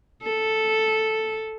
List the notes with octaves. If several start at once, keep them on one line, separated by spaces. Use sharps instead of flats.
A4